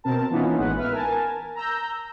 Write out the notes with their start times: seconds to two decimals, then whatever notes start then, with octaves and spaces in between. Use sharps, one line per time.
0.04 B2 C4 A#4 A5
0.30 E3 A#3 B3 C#4 D#4 F4
0.58 A1 G#3 B3 B4 F#5
0.76 B4 E5 F6
0.91 A#4 G#5 A5
1.55 A#5 E6 G6